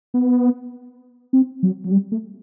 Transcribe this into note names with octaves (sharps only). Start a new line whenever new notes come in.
B3
C4
F#3
F#3
G3
A3